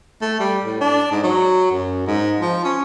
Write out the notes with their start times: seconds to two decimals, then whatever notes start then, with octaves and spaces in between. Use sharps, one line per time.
0.22 A3
0.40 G3
0.64 A2
0.81 D4
1.11 G#2
1.23 F#3
1.71 F#2
2.07 G#2
2.40 F3
2.64 C#4